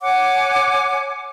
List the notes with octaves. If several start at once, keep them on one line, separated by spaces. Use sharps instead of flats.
C#5 F#5 G#5 D6